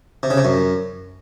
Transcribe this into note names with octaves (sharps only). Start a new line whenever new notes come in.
C3
C#3
C3
F#2